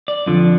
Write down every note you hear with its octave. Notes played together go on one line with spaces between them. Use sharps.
D5
F2 D3 F3